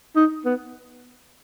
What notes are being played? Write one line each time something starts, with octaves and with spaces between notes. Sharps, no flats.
D#4
B3